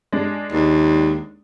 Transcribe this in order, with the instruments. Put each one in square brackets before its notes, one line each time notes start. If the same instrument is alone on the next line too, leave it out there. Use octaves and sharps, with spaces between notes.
[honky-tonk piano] G#3 D4
[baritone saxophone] D#2